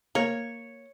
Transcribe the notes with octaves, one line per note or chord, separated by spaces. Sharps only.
A#3 C#5